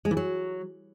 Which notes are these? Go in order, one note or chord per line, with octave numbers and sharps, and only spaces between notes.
G#3
E3
F#3